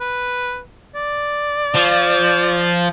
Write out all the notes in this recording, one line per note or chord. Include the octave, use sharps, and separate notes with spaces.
B4
D5
F3